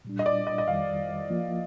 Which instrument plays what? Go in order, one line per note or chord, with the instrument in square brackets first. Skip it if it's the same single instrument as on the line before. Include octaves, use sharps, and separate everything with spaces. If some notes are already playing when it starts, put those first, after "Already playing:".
[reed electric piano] A#2 G3 D4
[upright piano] D#5
D5
D#5
D#5
[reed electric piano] F2 D#3 G3 [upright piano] F5
[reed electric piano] F3 A#3 F4